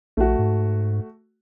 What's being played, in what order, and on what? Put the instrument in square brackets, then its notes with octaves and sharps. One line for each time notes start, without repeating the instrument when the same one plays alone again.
[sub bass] A#1 [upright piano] A3 F#4
[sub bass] G#2